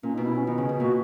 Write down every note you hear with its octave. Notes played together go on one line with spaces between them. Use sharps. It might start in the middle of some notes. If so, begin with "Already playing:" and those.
A#2 C#4
B2 D#4
E4
C#4
D#3 B3
C#3 C#4
B2
A#2 F#4